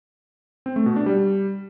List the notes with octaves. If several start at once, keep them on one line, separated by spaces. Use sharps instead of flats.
C4
A3
B2
D4
G3